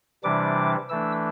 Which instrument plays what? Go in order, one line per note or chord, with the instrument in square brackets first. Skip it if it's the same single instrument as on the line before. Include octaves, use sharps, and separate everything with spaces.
[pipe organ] C3 E3 G3 D4 D6
E3 A3 D4 E6